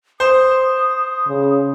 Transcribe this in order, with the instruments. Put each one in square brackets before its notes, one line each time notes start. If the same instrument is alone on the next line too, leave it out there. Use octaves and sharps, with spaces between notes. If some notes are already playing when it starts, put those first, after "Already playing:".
[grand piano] C5 [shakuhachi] D#6
[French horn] C#3